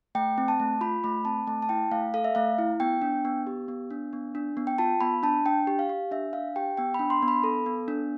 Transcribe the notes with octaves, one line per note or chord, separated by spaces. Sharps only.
A3 G5
C4
A5
A3
F4 B5
A3 B5
C4 A5
A3 A5
A5
E4 G5
A3 F5
A4 F5
E5
A3 F5
E4
B3 G5
D4
B3
G4
B3
D4
B3
D4
B3
G5
F4 A5
B3 B5
D4 A5
D4 G5
G4
F5
G4
D4 E5
D4 F5
G4 G5
B3 G5
B5
D4
C6
B3
B5
A4
B3
D4